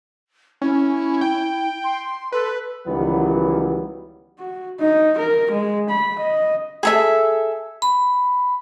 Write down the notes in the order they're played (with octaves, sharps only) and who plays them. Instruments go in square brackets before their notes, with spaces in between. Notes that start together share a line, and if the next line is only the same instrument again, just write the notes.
[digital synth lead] C#4 [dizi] E4
[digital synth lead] G5
[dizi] C6
[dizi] A4 [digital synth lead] B4
[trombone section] C#2 D#3 E3 F#3 G3 B3
[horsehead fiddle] F#4
D#4
A#4
G#3
B5
D#5
[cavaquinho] G#4 A4 E5
[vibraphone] B5